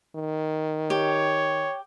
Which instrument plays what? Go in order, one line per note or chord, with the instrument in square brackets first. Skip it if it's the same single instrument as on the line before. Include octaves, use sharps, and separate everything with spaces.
[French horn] D#3
[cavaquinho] G4 [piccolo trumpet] C#5